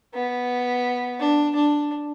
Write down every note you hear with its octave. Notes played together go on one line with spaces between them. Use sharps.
B3
D4
D4